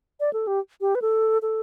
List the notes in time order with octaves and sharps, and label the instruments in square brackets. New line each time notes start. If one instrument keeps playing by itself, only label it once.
[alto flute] D5
A4
G4
G4
B4
A4
A4